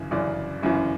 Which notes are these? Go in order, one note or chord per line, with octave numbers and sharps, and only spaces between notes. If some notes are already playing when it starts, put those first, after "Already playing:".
Already playing: G1 F#2 C#3 E3
G1 F#2 C#3 E3 D5
G1 F#2 C#3 E3